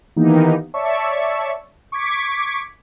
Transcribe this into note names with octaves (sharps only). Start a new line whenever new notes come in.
D#3 E3 A#3 B3 D#4 G4
C#5 D5 E5 A5 C#6
C#6 D6 G#6 B6